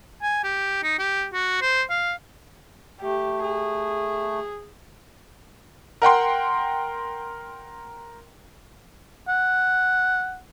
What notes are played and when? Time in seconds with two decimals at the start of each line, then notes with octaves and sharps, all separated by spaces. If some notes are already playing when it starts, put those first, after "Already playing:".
0.22 G#5
0.44 G4
0.83 D#4
0.99 G4
1.34 F#4
1.62 C5
1.90 F5
3.02 A3 G4
3.44 G#4
6.02 A#4 F#5 G5 C6
9.28 F#5